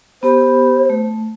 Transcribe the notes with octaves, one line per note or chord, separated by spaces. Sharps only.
B3 G4 C5 B5
A3